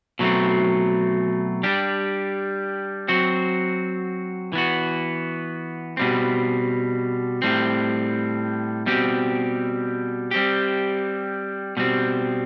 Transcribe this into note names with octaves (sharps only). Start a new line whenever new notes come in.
B2 F#3 A3 C4
G3 D4 G4
F#3 C4 F#4
E3 B3 F#4
B2 G3 C4
A2 G3 C4
B2 G3 C4 G4
G3 C4 G4
B2 G3 C4